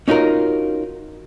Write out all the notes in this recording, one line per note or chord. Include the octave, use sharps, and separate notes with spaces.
C#4 D#4 F4 F#4 A#4